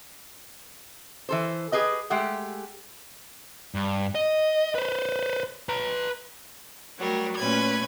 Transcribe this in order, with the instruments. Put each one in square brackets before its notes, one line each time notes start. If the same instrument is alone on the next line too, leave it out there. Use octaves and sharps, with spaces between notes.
[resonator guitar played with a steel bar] E3 A4 C5
G4 G#4 B4 D#5
G#3 A3 G4 F#5
[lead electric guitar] G2
D#5
B4 C5
B4 A#5
[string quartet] F#3 G3 A3 A#4
A#2 A3 C#4 B4 G#6